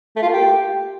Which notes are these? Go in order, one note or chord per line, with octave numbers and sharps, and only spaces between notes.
A3
F4
A#3
G4